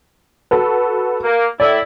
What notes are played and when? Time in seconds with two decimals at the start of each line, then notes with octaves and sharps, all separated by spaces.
0.51 F#4 A4 B4
1.24 A#3
1.60 A2 E4 D5